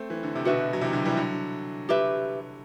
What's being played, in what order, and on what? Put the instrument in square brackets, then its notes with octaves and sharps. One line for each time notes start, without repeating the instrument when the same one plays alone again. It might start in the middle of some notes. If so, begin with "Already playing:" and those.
Already playing: [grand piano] A3 C4
E3
D3
C3
[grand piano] B2 D3 [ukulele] F#4 B4 E5
[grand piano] F#3
C3 E3
D3 F#3
E3 G3
D3 F#3
[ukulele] G4 B4 E5